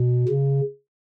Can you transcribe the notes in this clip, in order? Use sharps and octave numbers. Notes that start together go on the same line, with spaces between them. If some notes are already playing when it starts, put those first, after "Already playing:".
Already playing: B2
C#3